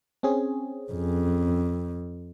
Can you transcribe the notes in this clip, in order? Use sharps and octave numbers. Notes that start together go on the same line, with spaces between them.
C4 C#4 G#4
F2